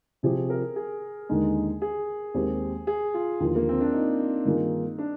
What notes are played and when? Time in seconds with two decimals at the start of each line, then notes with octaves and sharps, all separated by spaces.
0.23 C3 F3 C4 G4 G#4
0.50 A#4
0.76 G#4
1.29 D#2 D3 G#3 D#4
1.82 G#4
2.34 D#2 D#3 G#3 C4 G4
2.87 G#4
3.14 F4
3.40 D#2 D3 F3
3.56 A#3
3.69 C4
3.81 D4
3.93 D#4
4.45 G2 D#3 A#3 F4 G#4
4.99 D4